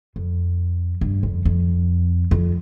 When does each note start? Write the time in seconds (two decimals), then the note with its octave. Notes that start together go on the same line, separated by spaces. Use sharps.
0.16 F2
1.01 G2
1.23 F2
1.45 F2
2.31 F2